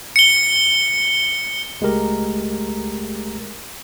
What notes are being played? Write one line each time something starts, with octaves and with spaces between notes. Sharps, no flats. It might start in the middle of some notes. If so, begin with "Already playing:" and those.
C#7 G7
C#2 G#3 A3 G4 A#4 A#5